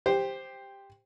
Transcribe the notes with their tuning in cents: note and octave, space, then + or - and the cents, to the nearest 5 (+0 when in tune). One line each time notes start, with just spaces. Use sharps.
G4 +10 C5 +0